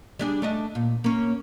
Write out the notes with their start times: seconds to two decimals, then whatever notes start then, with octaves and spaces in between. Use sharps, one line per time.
0.19 G3 D4 G#4
0.42 A3 D4 D#5
0.75 A#2
1.04 A#3 C#4